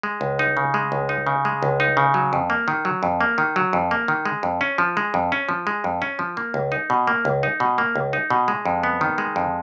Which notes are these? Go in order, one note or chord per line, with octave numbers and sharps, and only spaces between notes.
G#3
C#2
D#4
C#3
G#3
C#2
D#4
C#3
G#3
C#2
D#4
C#3
F#3
F2
A#3
D#3
F#3
F2
A#3
D#3
F#3
F2
A#3
D#3
G#3
F2
C#4
F3
G#3
F2
C#4
F3
G#3
F2
C#4
F3
A#3
C#2
D#4
B2
A#3
C#2
D#4
B2
A#3
C#2
D#4
B2
G#3
F2
B3
D#3
G#3
F2